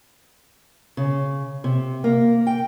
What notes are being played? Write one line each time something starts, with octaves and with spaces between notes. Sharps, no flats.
C#3
C3
A#3
G5